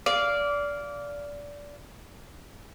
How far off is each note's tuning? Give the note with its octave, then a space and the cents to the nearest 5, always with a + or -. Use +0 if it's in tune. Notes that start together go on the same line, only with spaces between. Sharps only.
D5 -20 F5 +0